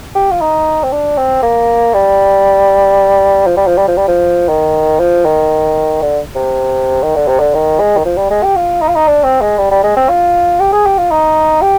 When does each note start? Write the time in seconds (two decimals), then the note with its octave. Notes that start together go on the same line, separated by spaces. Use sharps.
0.15 G4
0.31 F4
0.41 D#4
0.83 C4
0.92 D4
1.17 C4
1.43 A#3
1.94 G3
3.47 F3
3.57 G3
3.67 F3
3.78 G3
3.88 F3
3.98 G3
4.08 F3
4.49 D#3
5.00 F3
5.25 D#3
6.02 D3
6.35 C3
7.03 D#3
7.16 D3
7.28 C3
7.40 D3
7.55 D#3
7.80 G#3
7.97 D#3
8.05 F3
8.18 G3
8.31 G#3
8.44 G4
8.56 F4
8.82 D#4
8.89 F4
8.96 D#4
9.07 D4
9.24 C4
9.41 G#3
9.58 G3
9.71 G3
9.83 G#3
9.97 C4
10.09 F4
10.60 G4
10.73 G#4
10.86 G4
10.98 F4
11.11 D#4
11.62 G4